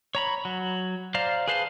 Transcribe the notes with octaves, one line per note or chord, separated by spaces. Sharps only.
C#5 A#5 B5
F#3
C5 D5 F5 A#5
G#4 B4 C5 F5 A5